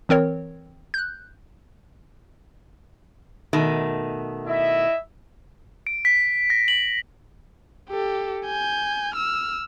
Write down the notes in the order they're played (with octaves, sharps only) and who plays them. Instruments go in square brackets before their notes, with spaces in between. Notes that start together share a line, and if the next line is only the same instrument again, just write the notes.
[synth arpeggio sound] E3 C4 A#4 C#5
F#6 G6
[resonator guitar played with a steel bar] B2 D#3 A3
[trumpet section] E4 D#5 E5
[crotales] D7
B6
A#6
F#7
[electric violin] G4 A4
G#5 G6
E6 F6